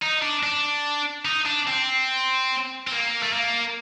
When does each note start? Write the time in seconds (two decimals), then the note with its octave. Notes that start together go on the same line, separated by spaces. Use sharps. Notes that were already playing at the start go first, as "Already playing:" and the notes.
0.02 D#4
0.22 D4
0.43 D4
1.25 D#4
1.46 D4
1.68 C4
2.87 C4
2.92 A#3
3.23 A3
3.33 A#3